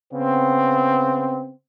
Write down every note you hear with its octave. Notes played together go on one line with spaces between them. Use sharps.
C#3 B3 C4